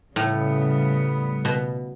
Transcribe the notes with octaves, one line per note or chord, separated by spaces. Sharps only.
A2 C#3 G3 B3
B2